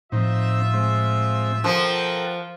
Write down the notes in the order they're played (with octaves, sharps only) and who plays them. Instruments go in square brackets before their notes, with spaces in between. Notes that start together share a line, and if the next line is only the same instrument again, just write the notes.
[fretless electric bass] A2 F3 A3 [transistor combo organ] C4 D#4 [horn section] F4 E5
[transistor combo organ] G#3 C4
[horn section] B2 G5 [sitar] F3 [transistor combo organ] A4 A#4 F#5